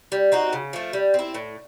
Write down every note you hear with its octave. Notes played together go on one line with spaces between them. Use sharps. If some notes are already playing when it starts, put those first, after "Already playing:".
G3
C4 D#4 F#4
C#3
F3 A3
G3
C4 E4
A2